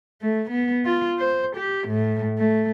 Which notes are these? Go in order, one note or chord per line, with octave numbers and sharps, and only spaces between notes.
A3
B3
F4
C5
G4
A2
A3